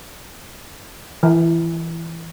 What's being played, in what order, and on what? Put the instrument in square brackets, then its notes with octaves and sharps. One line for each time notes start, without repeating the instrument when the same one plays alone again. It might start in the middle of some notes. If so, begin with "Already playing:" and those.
[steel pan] E3